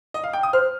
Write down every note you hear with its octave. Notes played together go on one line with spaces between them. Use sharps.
D#5
F5
G5
D#6
C5 F6